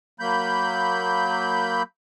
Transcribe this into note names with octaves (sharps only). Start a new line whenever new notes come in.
F#3 A#3 B5 G6